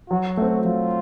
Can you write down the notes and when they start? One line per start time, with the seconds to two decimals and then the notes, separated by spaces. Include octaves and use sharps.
0.10 F#3 F#4
0.37 A3 C4
0.65 F#3 F4